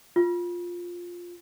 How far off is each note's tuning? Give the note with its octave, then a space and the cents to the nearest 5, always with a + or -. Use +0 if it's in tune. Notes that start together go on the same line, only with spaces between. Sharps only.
F4 +5